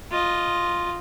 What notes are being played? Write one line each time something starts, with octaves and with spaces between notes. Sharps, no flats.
F4 D#5